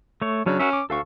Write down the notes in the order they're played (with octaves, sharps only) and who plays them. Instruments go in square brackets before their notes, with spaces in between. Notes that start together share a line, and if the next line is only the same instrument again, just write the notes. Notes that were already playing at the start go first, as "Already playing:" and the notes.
[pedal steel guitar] A3 C#5
[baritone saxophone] C#3 [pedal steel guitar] F#3 C#4 D4
[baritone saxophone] C#4 [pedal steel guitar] F#4 A#4 E5
[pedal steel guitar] D6
[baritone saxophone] D2 [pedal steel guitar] A4 F5 C#6